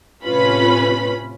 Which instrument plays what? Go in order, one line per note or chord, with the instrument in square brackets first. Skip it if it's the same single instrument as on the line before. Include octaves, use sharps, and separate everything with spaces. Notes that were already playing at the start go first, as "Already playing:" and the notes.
[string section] A2 C3 C#4 F4 B4 B5